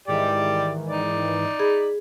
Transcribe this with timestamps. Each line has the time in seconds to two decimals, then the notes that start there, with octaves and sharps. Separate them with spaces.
0.08 G#2 D#3 E3 G4 D5
0.89 D#4 D5
1.60 G#4 B5